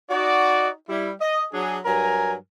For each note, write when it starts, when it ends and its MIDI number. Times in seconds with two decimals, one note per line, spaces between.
0.10 0.70 63
0.10 0.70 66
0.10 0.70 74
0.89 1.11 55
0.89 1.11 64
1.21 1.44 75
1.53 1.78 54
1.53 1.78 62
1.53 1.78 68
1.85 2.35 43
1.85 2.35 54
1.85 2.35 70
1.85 2.35 80
1.85 2.35 82